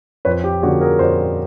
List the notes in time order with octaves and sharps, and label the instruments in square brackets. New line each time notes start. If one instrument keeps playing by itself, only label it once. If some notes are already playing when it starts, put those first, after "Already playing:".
[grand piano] F2 B4 C#5
G4
D3 F3 A#3 C#4 F#4 G#4
G#4 A#4
F2 C5 D5